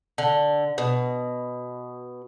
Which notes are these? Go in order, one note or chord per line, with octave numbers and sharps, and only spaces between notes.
D3
B2